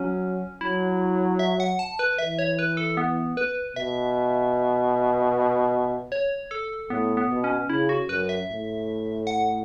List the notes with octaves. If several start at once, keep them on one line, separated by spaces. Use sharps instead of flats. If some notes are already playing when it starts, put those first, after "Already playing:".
Already playing: F#3 C#4
F#3 E4
E5
F#5
A5
B4
E3 E5
C#5
B4
A4
B3
B4
B2 E5
C#5
A4
A2 B3
B3
B2
C#4
C#3 E4
F#4
F#2 B4
E5
A2
F#5